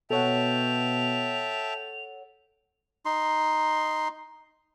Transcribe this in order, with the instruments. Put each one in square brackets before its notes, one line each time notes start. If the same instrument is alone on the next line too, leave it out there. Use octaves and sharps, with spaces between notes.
[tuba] B2 [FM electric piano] A4 C#5 F#5 [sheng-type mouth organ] E5 G5 A5 [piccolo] F7
[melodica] D#4 C6